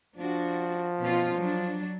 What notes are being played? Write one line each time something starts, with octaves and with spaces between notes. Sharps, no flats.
F3 D4 F#4
B2 C#4 F4
F#3 D4